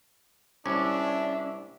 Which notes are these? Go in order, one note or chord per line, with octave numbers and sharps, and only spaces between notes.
C2 C#4 D4 E5